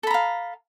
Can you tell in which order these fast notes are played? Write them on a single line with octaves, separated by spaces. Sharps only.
A4 B5 A#5 F5